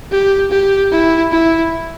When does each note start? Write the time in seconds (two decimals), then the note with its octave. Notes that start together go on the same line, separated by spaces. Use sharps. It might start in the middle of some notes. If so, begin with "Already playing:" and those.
0.11 G4
0.51 G4
0.92 E4
1.32 E4